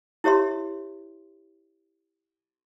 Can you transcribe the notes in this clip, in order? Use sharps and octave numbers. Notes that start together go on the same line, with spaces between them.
E4 G4 C#5 E5 C6